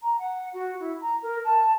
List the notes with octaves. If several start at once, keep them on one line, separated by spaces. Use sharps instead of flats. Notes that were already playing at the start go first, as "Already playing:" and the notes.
A#5
F#5
F#4
E4
A#5
A#4
A5